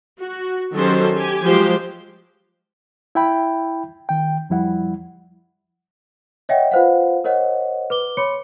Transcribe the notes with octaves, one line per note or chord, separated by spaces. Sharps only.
F#4
D#3 F#3 C#4 G4 A4 C5
G4 G#5
F3 F#3 G#3 G4 C5
E4 E5 G5 B5
D#3 G5
F2 F3 G3 E4 F#5
C#5 D#5 E5 F#5 G5
F4 B4 C5 F5 F#5
A#4 C5 C#5 D#5 F#5
B4 D6 G7
C#5 B5 C6 D6 C#7